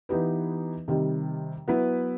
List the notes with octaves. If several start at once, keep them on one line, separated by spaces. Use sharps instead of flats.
E3 B3 D#4 G4 B4
C3 D#3 G3
F#3 B3 E4 B4